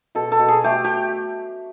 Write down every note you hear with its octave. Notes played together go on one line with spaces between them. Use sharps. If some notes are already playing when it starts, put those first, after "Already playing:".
B2 A4
A4
B2
G#4
A3 G4
G4